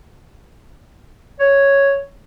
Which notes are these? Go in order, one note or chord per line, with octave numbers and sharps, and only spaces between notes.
C#5